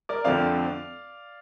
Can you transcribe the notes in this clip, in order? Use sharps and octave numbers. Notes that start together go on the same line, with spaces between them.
A#4 D5
F2 D3 F3 A3 C4 D5 F5